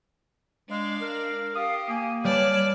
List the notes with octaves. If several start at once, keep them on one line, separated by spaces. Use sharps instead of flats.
G#3 D4 F5
A#4
G4 F5 D#6
A#3 G#5
G3 B4 C#5 D5 A5 F6